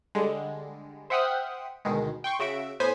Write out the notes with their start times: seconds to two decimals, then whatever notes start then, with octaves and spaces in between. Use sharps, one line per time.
0.15 D3 G3 G#3
1.10 C5 E5 F#5 G5 D#6 F6
1.85 D2 B2 D#3 G#3
2.24 G5 C6 C#6
2.39 C#3 F#4 E5 D7
2.80 A2 B3 C5 G#5 B6